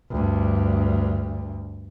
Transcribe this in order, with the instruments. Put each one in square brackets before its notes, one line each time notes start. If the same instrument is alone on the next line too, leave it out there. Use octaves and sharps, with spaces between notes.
[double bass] D2 G2